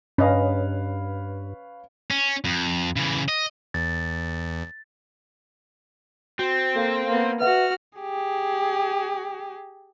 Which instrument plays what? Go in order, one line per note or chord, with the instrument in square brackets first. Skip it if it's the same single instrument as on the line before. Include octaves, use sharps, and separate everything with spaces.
[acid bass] G2 [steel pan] C#4 D#5 [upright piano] B4 C#5 F5
[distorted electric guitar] C#4
F2
C#3 E3
D#5
[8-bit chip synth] E2 [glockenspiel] A6
[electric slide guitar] C4 [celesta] F#4
[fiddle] A#3 [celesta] A4 F5
[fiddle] A#3 B3
[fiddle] F#4 F6 [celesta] B4 E5 F#5
[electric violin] G4 G#4